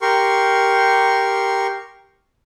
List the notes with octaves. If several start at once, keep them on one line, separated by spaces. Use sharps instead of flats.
G4 A#4 C6 C#6